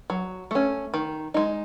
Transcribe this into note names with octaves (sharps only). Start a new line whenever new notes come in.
F#3
A3 C#4
D#3
G#3 D#4